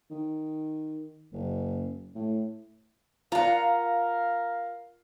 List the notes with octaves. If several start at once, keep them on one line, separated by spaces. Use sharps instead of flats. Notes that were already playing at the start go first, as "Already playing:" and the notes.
D#3
F#1
A2
F4 A#4 F5 F#5 A#5